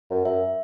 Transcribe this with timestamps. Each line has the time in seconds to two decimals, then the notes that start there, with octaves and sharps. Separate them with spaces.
0.11 F#2
0.25 F#2 E5